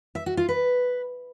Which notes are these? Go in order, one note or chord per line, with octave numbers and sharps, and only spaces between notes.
E5
F#4
F4
B4